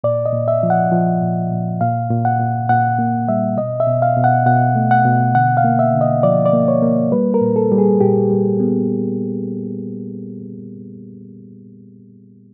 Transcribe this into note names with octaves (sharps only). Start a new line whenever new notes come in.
A#2 D5
D#5
A#2
E5
F3
F#5
F3
A#2
A#2
A#2 F5
A#2
F#5
A#2
A#2 F#5
A#3
G3 E5
B2 D#5
E5
B2
F5
B2
F#5
B2 F#5
A3
F#5
B2
D3 F#5
F5
A#3
E5
D3
D#5
F3 D5
D5
A#3
C#5
A#3
G3 B4
A#4
A#2
A4
G3
G#4
A#2 G4
G3
B3